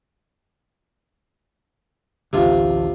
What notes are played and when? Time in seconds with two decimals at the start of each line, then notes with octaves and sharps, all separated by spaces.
2.33 A1 D2 C3 F4